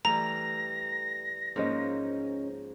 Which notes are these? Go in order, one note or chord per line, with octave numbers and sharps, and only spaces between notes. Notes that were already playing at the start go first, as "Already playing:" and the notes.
E3 G3 A3 A#5 A#6
G#2 F3 A#3 C#4 D#5